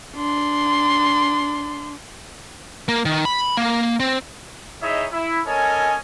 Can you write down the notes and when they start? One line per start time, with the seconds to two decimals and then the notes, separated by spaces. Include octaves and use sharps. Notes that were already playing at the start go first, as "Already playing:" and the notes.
0.17 D4 C6
2.88 A#3
3.05 D#3
3.25 B5
3.57 A#3
4.00 C4
4.82 D#4 E4 G#4 C#5 D#5 E5
5.12 E4
5.46 C#4 A4 A#4 C#5 D#5 G#5